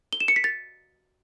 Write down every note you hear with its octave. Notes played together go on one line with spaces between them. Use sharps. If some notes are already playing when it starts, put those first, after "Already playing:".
G7
E7
C#7
B6
A6